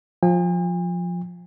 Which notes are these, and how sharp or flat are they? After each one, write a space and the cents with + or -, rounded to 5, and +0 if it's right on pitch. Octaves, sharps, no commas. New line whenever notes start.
F3 +15 G#5 -45